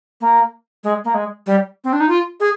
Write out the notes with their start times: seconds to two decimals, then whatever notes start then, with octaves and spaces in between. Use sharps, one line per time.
0.21 A#3
0.84 G#3
1.04 A#3
1.14 G#3
1.46 G3
1.84 C4
1.93 D4
2.00 D#4
2.09 F4
2.40 G#4